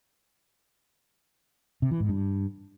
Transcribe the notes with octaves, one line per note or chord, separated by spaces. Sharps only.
C3
E3
G#2
G2